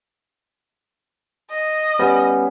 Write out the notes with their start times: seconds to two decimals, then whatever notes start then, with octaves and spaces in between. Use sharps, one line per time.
1.51 D#5
1.99 G3 B3 C#4